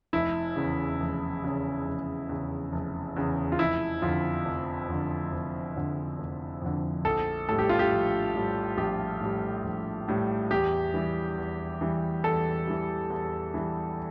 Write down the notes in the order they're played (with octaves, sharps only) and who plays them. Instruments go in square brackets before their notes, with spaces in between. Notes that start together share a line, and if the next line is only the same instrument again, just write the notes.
[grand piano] F1 E4
E2 C#3
F1
E2 C#3
F1
E2 C#3
F1
E2 C#3
F4
F1 E4
F2 D3 F4
F1
F2 D3
F1
F2 D3
F1
F2 D3
A#1 A4
A2 G3 A4
G4
F4
G4
A#1
A2 G3
A#1 G4
A2 G3
A#1
A2 G3
E2 G4
E3 G3
E2
E3 G3
E2 A4
E3 G3
E2
E3 G3